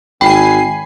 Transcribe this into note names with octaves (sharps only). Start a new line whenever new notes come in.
G#1 G5 G#5 B5 C7